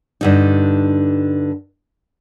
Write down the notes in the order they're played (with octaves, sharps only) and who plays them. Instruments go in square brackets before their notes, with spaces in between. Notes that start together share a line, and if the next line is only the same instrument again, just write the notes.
[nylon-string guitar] G2 D3 D#4